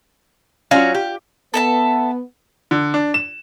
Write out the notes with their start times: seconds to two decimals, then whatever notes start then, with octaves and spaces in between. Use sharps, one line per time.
0.71 F#3 C#4 F4 F#4 D5 F5
0.94 G4
1.54 B3 A4 E5 A5
2.71 D3
2.94 D4
3.14 E7